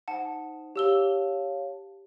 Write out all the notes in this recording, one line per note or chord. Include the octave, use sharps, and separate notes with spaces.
D#4 C5 F#5 A5
G4 C#5 F5 A5 E6 G7